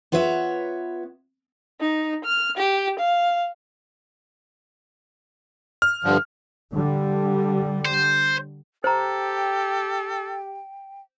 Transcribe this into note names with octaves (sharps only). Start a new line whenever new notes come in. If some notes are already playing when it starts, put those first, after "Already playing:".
B3 F4 B4 C#5 E5
D#4
F6
G4
F5
F6
G2 D3 F3
D3 G3
C5
G4 A4 C5 G5 A#5